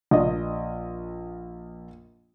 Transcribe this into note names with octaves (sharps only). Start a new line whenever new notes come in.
A#1 D#5